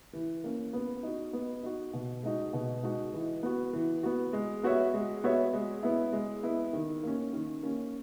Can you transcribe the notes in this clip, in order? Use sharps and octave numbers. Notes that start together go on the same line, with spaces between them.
E3
A#3 C#4
B3
D#4 F#4
B3
D#4 F#4
B2
G#3 D#4 F#4
B2
G#3 D#4 F#4
E3
B3 F#4
E3
B3 F#4
G#3
B3 F#4 C#5 E5
G#3
B3 F#4 C#5 E5
G#3
B3 E4
G#3
B3 E4
D#3
A#3 C#4
D#3
A#3 C#4